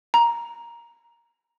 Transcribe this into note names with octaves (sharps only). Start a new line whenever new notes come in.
A#5